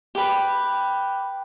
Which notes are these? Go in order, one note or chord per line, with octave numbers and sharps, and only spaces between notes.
G4 B4